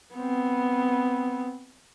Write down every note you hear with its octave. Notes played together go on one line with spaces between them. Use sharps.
B3 C4